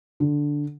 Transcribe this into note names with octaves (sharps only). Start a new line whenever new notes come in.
D3